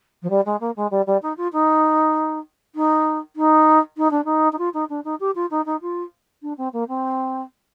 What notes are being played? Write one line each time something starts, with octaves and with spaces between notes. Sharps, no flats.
F3
G3
G#3
A#3
G#3
G3
G3
D#4
F4
D#4
D#4
D#4
D#4
D4
D#4
D#4
F4
D#4
D4
D#4
G4
F4
D#4
D#4
F4
D4
C4
A#3
C4